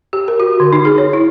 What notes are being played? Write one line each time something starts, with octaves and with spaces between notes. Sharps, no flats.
G4
A#4
F#4
D3
D#4
G#4
C#5
E4